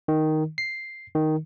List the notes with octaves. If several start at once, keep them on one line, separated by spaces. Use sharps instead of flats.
D#3
C7
D#3